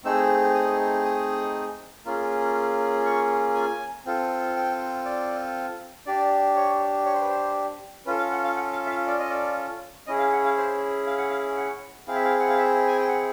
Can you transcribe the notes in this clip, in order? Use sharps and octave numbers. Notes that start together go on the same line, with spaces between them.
A3 C4 D#4 G#4 E6
D#6
D#6
A#3 C#4 F4 G#4
C#6
G#5
C4 F4 A4
G5
D5
D4 G4 D5
C#5
C#5
C5
B4
C5
C#4 F4 A4 B4
F5
F#5
F5
F#5
F5
E5
F5
D5
D#5
D5
C#4 E4 G#4 D#5
F5
F#5
F5
C5
F5
F#5
F5
F#5
C4 E4 G#4 F5
E5
F5
F#5
F5
E5
G#5
G5
F#5